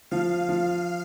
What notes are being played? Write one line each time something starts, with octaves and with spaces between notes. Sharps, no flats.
F3 F5
F3